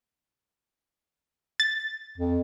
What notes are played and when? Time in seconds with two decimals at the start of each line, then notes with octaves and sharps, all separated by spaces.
1.60 A6
2.18 F2